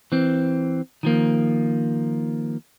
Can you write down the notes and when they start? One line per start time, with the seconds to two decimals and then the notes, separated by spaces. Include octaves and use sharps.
0.12 E3 C4
1.03 D#3 F3 A#3